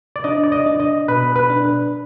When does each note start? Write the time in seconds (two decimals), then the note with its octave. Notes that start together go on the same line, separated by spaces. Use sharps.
0.16 D5
0.24 D4 D#5
0.43 D5
0.52 D#5
0.66 D4
0.80 D#5
1.08 B2 B4
1.36 B4
1.50 D4